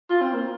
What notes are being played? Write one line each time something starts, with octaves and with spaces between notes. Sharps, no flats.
F4
C4
A#3